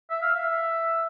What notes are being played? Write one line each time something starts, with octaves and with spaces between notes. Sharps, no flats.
E5
F5
E5